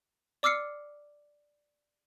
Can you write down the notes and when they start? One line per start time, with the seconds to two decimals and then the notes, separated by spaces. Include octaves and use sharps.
0.43 D5 D6 E6 F6 C7 C#7